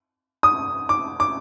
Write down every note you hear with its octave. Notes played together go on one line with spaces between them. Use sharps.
D#6
D6
D6